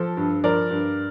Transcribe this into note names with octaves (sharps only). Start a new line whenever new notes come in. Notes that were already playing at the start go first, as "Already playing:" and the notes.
Already playing: F3 A4
G2
F3 A#4 D5
G2